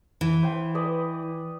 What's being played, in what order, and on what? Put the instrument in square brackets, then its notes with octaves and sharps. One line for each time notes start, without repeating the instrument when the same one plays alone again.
[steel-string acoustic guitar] E3
[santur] C5 G5 B5
B4 D5 D#5